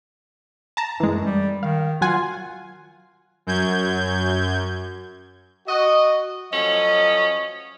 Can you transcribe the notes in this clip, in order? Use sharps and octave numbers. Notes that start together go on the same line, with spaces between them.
A5 A#5
F#2 E3 G#3
G3
D#3 F5
F#3 F4 F#5 G#5
F#2 G6 G#6
F#4 D#5
F3 F#3 A3 C#4 D#5